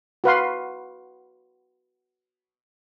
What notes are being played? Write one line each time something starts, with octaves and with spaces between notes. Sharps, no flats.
F#4 B4 F5 C6